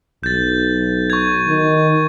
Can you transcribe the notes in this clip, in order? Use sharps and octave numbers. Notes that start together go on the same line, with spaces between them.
B1 G6 A6
C#6 G#6
D#3